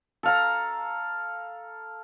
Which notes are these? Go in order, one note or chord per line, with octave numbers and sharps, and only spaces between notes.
A4 F5 A#5